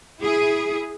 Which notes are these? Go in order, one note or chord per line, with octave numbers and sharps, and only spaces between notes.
E4 G#4